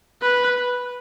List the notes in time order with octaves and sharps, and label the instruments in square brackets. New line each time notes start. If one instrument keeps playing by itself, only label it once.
[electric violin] B4